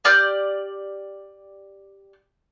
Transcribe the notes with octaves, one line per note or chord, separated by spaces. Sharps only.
G4 D5 F6 G6